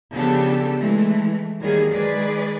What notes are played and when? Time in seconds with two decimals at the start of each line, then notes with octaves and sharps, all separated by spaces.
0.11 C#3 F3 B3 D4 G4 A4
0.78 E3 G#3 A3
1.60 D#3 F#3 G3 A#3 G#4
1.92 D#3 G#3 G#4 B4 D5